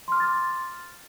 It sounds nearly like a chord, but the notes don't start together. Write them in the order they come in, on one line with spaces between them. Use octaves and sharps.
C6 F6 D6 A6